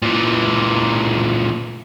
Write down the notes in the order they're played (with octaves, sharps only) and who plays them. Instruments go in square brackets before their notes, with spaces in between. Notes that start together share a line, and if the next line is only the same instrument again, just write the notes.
[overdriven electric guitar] A#2 E3